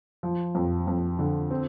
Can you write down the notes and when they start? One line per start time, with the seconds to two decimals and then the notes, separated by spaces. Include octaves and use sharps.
0.23 F3
0.55 F2
0.87 F2
1.19 D3
1.51 C4